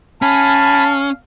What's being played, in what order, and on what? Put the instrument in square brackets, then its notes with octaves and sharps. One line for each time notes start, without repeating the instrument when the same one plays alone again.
[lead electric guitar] C#4 [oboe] F5 [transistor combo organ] G#5 B5 [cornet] A5